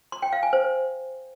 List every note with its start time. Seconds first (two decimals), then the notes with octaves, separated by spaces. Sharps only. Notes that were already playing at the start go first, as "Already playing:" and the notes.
0.12 C6
0.22 G5
0.33 F5
0.43 G#5
0.53 C5